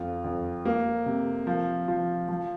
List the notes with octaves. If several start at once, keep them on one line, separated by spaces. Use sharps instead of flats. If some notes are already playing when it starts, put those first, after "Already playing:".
Already playing: F2 F4
F2
A#3
C3
F3
F3
F3